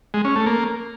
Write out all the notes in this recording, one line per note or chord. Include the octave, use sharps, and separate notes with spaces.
G#3
C#4
A3
A#3